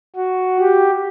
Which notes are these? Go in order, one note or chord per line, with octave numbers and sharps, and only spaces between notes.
F#4
G4